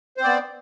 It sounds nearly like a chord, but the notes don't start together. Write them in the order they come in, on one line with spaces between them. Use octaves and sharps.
C5 C4 D5 B3